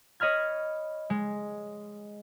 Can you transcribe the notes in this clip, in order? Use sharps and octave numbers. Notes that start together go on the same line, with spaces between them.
C#5 D#5 B5 F6 G#6
G#3